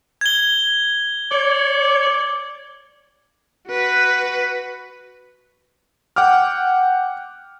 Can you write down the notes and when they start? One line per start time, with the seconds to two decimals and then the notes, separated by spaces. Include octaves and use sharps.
0.21 G#6 G7
1.32 C#5 D5
3.68 F#4 B4
6.16 F#5 G5 D6 F6